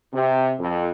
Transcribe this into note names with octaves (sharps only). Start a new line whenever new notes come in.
C3
F2